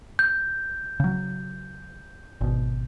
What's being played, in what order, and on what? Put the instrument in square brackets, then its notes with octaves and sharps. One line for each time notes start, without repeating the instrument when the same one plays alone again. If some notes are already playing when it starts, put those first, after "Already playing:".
[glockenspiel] G6
[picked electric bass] C#3 F#3
G#1 B2